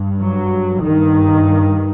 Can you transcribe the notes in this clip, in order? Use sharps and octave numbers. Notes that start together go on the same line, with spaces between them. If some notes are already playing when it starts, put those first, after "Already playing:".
Already playing: G2
F#3
G2 D#3